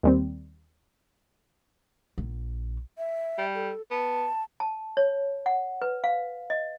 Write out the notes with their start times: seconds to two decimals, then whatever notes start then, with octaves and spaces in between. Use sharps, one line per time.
0.03 D#2 G3 C4
2.18 A#1
2.98 E5
3.38 G3
3.55 A4
3.91 B3 A5
4.60 A5
4.97 C#5
5.46 F#5
5.82 B4
6.04 F5
6.50 D#5